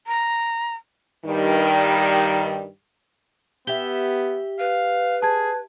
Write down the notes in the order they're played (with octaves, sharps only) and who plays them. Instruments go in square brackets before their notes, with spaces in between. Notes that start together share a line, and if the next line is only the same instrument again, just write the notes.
[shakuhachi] A#5
[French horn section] G2 D#3 G3
[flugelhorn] B3 [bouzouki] G4 E5 [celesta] G7
[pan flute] B4 [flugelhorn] F5
[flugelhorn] G#4 [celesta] A5 G#6